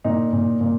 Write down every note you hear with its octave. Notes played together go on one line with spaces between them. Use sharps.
A#2 D#4
A#2
A#2